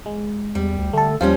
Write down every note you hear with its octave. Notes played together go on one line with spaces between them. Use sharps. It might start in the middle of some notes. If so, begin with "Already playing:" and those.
G#3
E2 G3
D2
D3 A3 A4
D#2 F3 G3 C#4 F4